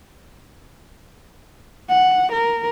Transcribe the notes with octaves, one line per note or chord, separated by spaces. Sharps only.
F#5
A#4